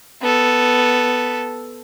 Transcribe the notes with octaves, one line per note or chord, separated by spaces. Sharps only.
B3 A4